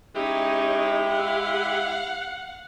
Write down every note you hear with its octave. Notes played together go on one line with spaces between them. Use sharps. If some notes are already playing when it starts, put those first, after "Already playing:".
G#3 C#4 D#4 E4 G4
F5 F#5